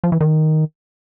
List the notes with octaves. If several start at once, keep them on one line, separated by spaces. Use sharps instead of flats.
F3
E3
D#3